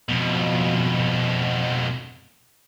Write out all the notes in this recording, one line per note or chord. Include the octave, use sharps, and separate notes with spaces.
F2 B2